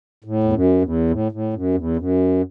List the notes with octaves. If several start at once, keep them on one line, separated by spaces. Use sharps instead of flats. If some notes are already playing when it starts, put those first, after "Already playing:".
A2
E2
F#2
E2
A2
A2
F#2
E2
F#2